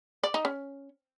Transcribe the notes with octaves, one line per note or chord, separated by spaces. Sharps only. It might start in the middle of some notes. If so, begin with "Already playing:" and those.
D5
D#4
C#4